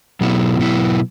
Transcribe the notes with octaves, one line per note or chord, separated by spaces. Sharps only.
B2 F#3 B3 E4
B2 F#3 B3 E4